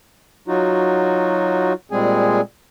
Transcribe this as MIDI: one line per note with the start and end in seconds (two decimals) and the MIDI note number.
0.48 1.73 54
0.48 1.73 63
0.48 1.73 65
0.48 1.73 66
1.91 2.41 46
1.91 2.41 55
1.91 2.41 56
1.91 2.41 60
1.91 2.41 68
1.91 2.41 80